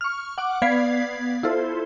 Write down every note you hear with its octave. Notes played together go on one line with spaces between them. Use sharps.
C#6 F6
F#5 D6
B3 D5 F5 G#6 B6 C7
E4 F4 A4 C5